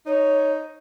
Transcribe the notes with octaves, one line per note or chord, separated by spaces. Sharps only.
D#4 C#5